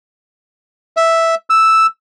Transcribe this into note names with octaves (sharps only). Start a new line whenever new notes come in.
E5
E6